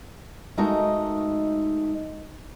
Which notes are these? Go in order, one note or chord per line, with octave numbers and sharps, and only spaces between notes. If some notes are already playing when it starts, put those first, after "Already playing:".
G#3 A3 D#4 F#4 A#4 D#5